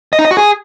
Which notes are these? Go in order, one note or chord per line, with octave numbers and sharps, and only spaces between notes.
D#5
D#4
D#5
F#4
G#4